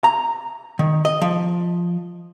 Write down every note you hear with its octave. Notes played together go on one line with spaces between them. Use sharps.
A#5
D#3
D#5
F3